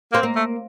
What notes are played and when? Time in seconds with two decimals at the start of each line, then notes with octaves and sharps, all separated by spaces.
0.12 A#3 C4
0.23 A#3
0.36 A3